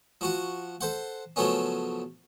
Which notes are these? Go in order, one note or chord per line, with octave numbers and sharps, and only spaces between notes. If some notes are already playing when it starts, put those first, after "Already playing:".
F3 F#4 F#5
A4 C5 F#5
C#3 F3 F#3 A3 B3 C#4